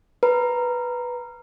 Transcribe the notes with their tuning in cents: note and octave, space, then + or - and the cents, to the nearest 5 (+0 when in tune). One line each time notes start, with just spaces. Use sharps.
B4 +0 A#5 +0